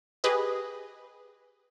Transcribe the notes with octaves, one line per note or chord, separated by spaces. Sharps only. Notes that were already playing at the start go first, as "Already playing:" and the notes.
G4 G#4 B4 D#5